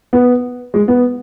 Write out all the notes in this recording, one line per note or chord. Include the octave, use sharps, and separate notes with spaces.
B3
G#3
B3